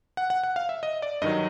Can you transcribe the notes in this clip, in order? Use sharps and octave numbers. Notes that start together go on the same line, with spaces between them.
F#5
F#5
F#5
F5
E5
D#5
D5
G2 D#3 F#3 D#5